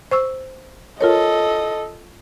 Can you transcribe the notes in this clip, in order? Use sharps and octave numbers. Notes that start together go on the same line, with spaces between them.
C5 C#6 E6
F4 A4 A#4 C#5 D#5